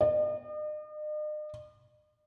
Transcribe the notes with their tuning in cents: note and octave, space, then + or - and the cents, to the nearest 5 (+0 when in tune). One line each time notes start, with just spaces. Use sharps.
D#5 -45